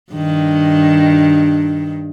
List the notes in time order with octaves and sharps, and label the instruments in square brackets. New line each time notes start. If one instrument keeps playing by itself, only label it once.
[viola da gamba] G2 D#3